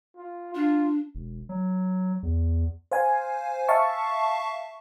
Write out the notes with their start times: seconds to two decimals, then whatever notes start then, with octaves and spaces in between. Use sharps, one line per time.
0.17 F4
0.55 D4 F4
1.15 E1
1.49 F#3
2.23 E2
2.92 C5 F5 G#5
3.69 E5 F5 A5 C#6